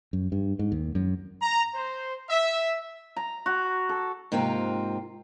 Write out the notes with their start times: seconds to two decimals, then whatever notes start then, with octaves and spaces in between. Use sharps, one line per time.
0.13 F#2
0.32 G2
0.59 G#2
0.72 D#2
0.95 F#2
1.42 A#5
1.75 C5
2.29 E5
3.16 A#5
3.46 F#4
3.89 A4
4.32 G#2 C3 A#3 C4 F4